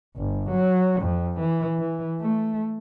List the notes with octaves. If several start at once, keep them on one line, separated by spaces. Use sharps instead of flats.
G1
F#3
F2
E3
E3
A3